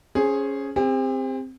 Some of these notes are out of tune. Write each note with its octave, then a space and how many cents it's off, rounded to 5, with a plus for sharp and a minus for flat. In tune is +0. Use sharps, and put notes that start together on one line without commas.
C#4 +0 G#4 +0 C5 +20
C4 +0 G4 +45